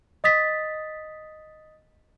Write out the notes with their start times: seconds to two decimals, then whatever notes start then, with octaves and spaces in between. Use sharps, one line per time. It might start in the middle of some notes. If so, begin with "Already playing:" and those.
0.24 D#5 D#6 A6 B6